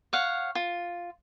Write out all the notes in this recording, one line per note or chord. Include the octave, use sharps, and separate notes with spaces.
C#5 F5 F#5
F4